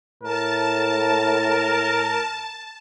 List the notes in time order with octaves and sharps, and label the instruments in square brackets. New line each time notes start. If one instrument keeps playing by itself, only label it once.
[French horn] A2 [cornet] A#4 [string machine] A5